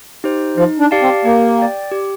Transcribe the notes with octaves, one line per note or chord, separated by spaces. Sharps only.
D#4 G4 C5
F3 D#4
D4
G4 D5 F5 A5
C4
A#3 G4
D5 G5
G4